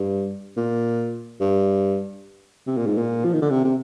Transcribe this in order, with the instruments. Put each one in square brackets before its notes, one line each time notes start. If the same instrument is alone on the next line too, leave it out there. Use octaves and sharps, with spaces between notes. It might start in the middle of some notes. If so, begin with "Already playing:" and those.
Already playing: [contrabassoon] G2
A#2
G2
C3
A#2
G#2
A#2
F3
D#3
D3
C3
C3